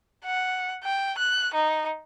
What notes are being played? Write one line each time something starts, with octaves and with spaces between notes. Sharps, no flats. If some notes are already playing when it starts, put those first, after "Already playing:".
F#5
G5
F#6
D#4